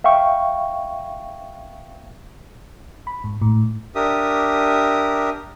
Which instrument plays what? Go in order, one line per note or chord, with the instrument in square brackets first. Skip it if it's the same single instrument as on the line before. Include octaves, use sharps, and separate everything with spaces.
[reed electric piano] E5 F5 G5 C#6
[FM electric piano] B5
G#2
A2
[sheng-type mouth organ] D4 G4 A#4 E5 D#6